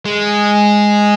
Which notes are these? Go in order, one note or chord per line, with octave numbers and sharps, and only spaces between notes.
G#3